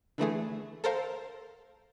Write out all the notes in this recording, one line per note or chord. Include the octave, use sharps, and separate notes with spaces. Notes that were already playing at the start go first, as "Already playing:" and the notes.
D3 E3 A3 G#4
A4 A#4 C5 F5